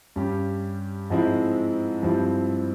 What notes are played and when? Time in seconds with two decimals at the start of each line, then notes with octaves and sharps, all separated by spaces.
0.16 G2 G3 C#4 G4
1.10 G#2 F3 G#3 C4 E4
2.03 G2 F3 C4 E4